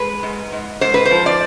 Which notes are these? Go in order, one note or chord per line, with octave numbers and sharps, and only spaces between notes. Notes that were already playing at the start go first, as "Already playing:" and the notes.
Already playing: G#3 B4
G#2
G#2
G#2 C5
B4
C5
F3
D5